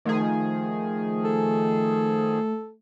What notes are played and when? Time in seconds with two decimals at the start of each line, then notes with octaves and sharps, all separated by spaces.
0.05 D#3 F3 A3 G#4
1.24 A4